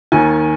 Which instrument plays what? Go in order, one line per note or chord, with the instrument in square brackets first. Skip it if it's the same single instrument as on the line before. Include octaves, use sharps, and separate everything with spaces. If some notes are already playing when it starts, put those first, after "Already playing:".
[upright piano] D#2 D#3 G#5